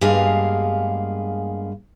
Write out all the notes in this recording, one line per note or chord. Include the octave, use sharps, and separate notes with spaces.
G2 G#3 A#3 B3 G#4 F5